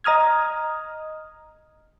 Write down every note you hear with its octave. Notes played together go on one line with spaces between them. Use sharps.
D#5 A#5 D#6 F6 G#6